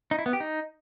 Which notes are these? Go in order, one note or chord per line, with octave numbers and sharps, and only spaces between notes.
D#4
E4
B3
G4
D#4